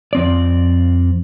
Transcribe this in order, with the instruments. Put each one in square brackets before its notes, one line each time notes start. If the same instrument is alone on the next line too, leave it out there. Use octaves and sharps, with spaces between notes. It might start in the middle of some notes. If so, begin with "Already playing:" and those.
[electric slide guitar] F2 C4 D5